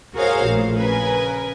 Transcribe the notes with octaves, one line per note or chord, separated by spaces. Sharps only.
F#4 G#4 A#4 C5 C#5 F5
A#1 A#2 A3
C#3 A#4 B4 G#5